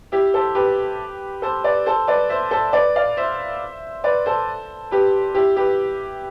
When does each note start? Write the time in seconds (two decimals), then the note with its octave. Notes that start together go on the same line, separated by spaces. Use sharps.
0.12 E4 G4
0.34 A4 C5
0.55 G4 B4
1.42 A4 C5
1.64 B4 D5
1.86 A4 C5
2.08 B4 D5
2.29 C5 E5
2.51 A4 C5
2.73 B4 D5
2.96 D5 F5
3.17 C5 E5
4.04 B4 D5
4.26 A4 C5
4.91 G4 B4
5.35 E4 G4
5.56 G4 B4